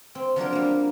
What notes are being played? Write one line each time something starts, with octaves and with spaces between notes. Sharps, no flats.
C4
F3 F#3 D4 A#4
G3 A#3